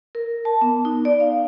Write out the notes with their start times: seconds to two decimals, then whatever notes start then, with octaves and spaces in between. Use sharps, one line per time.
0.15 A#4
0.45 A5
0.61 B3
0.85 D#4
1.05 D5
1.20 F5